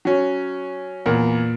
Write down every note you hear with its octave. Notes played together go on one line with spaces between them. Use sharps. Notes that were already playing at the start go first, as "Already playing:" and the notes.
F#3 C#4
E2 A#2 A#4